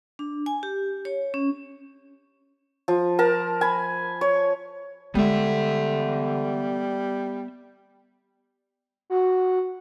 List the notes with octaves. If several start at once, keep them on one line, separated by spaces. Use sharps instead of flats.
D4
G#5
G4
C#5
C#4
F3
A#4 A5
G#5 B5
C#5
D3 G3 G#3 B3 C#4 E5
F#4